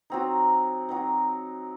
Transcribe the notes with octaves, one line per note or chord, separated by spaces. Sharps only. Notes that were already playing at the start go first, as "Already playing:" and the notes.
F#3 C4 D#4
F#3 C4 D#4